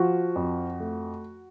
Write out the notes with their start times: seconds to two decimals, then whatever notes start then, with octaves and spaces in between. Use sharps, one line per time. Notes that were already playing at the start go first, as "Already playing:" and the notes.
Already playing: F3 F#4
0.36 F2
0.80 A3